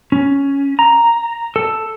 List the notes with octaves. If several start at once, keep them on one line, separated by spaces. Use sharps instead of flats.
C#4
A#5
A4